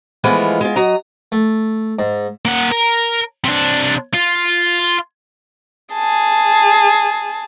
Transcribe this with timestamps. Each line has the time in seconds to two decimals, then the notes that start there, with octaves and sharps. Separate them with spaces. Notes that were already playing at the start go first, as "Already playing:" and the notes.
0.24 E3 F3 G#3 A3 B3 F4
0.61 G#3 F4
0.76 F#3 D#5 A#5
1.32 A3
1.99 G#2
2.45 A#3 F#5
2.72 A#4
3.45 C3 D4
4.14 F4
5.94 G#4 A5